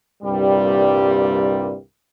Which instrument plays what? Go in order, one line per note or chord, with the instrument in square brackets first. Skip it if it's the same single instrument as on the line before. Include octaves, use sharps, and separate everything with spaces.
[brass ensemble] C2 G2 A#2 G3